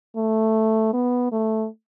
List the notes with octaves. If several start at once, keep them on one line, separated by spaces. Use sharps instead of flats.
A3
B3
A3